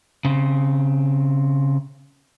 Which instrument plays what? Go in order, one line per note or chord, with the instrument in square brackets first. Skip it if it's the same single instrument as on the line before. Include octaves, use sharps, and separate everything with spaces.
[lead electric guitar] C#3 C4